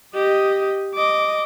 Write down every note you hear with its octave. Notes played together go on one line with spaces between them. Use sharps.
G4 D#5
D#5 D6